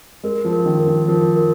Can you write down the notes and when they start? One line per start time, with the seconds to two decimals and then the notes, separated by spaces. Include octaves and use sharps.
0.23 G#3 A#4
0.45 F3
0.53 A#4
0.65 D#3
0.79 A#4
0.87 D#3
1.08 F3 A#4
1.36 A#4